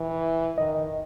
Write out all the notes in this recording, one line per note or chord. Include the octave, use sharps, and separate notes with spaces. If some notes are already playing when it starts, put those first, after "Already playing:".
Already playing: E3
D#3 D#5